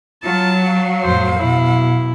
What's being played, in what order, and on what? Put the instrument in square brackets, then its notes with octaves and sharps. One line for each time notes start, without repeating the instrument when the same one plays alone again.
[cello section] F#3 [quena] F4 [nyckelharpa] A5
[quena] F5
[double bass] F2 A2 [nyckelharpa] C5
[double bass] B2 [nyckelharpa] E4